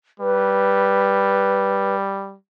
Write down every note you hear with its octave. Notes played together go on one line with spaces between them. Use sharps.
G3 B4